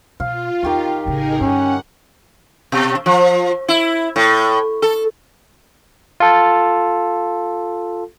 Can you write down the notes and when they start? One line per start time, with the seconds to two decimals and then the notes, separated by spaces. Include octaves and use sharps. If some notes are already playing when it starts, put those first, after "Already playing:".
0.20 B2 F4 F5
0.63 E2 D#3 G4 C#6
1.05 A1 C#3 D#4 G#4 A#4
1.40 G2 D3 C#4 F#5
2.72 B2
3.06 F3
3.68 E4
4.16 A2
4.82 A4
6.20 F4 A4